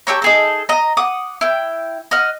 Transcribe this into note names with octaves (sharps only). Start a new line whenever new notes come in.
G4 A4 C#5 A#5
D#4 G#4 A4
D#5 A#5
F#5 D6 D#6
E4 G5
D#5 F#5 F6